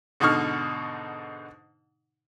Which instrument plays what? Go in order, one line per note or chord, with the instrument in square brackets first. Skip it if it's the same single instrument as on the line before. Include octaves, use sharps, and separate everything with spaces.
[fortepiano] G#2 B2 D3 D#4 C#6 F6